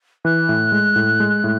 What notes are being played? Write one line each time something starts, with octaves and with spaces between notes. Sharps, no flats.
E3 F#6
A2
G#3
A2
G#3
A2